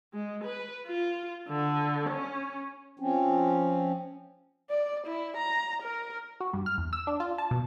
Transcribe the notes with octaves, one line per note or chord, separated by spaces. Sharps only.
G#3
B4
F4
D3
C#4
F3 C4 C#4
D5
E4
A#5
A#4
F#4
G2
F6
E2
E6
D4
F4
A5
B2